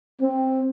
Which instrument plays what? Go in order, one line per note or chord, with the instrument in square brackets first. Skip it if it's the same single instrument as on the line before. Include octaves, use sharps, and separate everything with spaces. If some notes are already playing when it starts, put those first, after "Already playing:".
[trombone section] C4